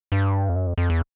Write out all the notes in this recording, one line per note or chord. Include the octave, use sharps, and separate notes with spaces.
G2
F2
F#2
F2
F2
E2